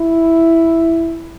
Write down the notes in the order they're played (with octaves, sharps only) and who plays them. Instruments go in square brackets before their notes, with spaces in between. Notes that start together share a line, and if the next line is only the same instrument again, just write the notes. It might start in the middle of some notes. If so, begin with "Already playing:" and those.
Already playing: [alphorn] E4